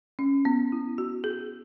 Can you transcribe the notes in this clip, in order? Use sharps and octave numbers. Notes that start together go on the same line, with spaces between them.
C#4
B3
E4
F#4
G#4